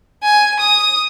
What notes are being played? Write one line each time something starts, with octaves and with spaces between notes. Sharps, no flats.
G#5
D#6